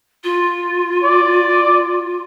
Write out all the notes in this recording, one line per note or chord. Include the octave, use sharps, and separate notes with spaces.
F4
D5